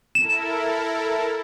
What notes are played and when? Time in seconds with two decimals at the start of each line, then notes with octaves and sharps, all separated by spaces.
0.15 E4 A4 A#4 E7